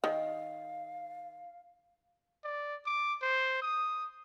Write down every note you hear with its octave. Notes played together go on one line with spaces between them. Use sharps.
D#3 F5
D5
D6
C5
D#6